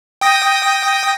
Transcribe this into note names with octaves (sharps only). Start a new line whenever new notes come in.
G5 D#6 A#6